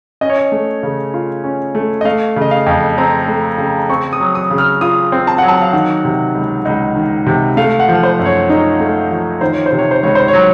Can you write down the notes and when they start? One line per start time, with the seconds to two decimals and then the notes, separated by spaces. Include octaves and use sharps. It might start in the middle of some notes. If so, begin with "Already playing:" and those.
0.21 C#4 D#5
0.30 C#5
0.38 D#5
0.52 A3
0.83 C#3
1.14 F4
1.44 C#4
1.75 A3
2.01 D#5
2.05 A3 F5
2.36 C#3
2.41 D#5
2.51 F5
2.66 F2
2.98 C4 A#5
3.28 A3
3.58 C#3
3.90 C4 C#6
4.13 D#6
4.20 F#3
4.35 D#6
4.50 C#3
4.58 F6
4.81 F4 D#6
5.12 C4
5.27 A5
5.38 F#3 F#5
5.48 A5
5.62 F5
5.73 D#3 F#5
6.05 C3
6.35 C#2
6.65 C#2 D#5
6.96 D#3
7.27 C3
7.57 A3 F5
7.80 F#5
7.88 F3
8.03 C5
8.19 F#2
8.26 C#5
8.49 D#4
8.80 A3
9.10 F3
9.41 D#3 C5
9.53 C#5
9.66 C5
9.72 C3
9.78 C#5
9.91 C5
10.03 C#2 C#5
10.15 C5
10.28 C#5
10.33 F#3